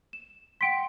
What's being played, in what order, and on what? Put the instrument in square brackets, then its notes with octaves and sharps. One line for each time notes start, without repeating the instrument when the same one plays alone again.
[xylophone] E7
[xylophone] F#5 G5 C6 [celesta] B6 D7